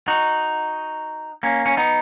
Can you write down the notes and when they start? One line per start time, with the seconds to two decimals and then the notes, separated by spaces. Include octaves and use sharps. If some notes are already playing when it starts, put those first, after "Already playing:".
0.08 D#4 F#4
1.43 A#3 C#4
1.66 C#4
1.77 B3 D#4